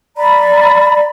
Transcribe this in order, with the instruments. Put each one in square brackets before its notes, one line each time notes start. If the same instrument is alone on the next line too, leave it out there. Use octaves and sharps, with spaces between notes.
[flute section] D5 A#5 B5